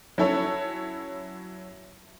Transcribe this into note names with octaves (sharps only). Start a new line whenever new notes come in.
F#3 C#4 E4 A4 C#5